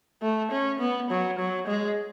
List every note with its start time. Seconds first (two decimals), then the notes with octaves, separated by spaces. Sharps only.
0.22 A3
0.51 C#4
0.79 B3
1.10 F#3
1.39 F#3
1.67 G#3